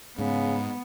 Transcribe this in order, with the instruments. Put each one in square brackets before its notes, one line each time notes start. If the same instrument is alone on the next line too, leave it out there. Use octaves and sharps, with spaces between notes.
[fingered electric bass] G#2 [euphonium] C#3 [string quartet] B3